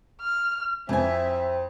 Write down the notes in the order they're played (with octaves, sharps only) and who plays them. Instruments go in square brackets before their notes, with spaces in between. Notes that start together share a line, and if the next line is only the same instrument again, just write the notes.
[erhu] F6
[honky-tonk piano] F2 [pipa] E3 G#5 [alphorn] C4 [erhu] E5